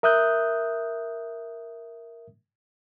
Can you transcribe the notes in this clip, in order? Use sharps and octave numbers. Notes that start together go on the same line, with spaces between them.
A#4 E5 D#6 F#6 G6